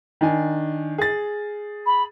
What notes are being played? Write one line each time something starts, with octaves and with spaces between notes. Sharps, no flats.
D#3 D4 G#5
G#4 A6
B5